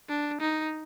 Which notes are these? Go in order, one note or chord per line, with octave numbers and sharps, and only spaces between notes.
D4
D#4